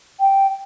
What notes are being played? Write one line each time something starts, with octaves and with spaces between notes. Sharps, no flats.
G5